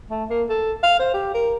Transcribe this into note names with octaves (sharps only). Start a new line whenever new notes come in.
A3
A#3
A4
F5
C5
G4
A#4